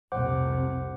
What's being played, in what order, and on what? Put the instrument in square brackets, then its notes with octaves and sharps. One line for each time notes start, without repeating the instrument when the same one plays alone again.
[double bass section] F1 C2 C3 [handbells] C5 F#5 D6